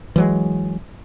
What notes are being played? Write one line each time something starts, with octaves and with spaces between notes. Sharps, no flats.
E3 F#3 G#3